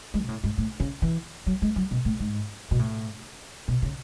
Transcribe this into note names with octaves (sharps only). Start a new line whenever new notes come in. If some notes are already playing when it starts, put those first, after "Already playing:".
G#3
B2
A2
G#2
A2
C#3
E3
F#3
G#3
F#3
B2
A2
G#2
B2
A2
B2
C#3